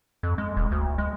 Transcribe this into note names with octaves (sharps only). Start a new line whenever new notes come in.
F2
G#3
D#1
D2
G#3